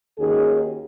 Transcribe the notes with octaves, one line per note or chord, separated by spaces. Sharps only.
D#2 D#3 C#4 F#4 G#4